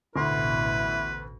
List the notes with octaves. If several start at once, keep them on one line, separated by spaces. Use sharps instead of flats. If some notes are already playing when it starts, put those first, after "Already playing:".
A1 D2 B2 E4 B4 C6